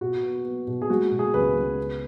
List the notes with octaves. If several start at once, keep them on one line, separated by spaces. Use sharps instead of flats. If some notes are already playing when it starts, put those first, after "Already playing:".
B2 F#4
B3
B3
B2
G#4
G#3 F#4
B2
G#4
C#2 B4
C#2
B3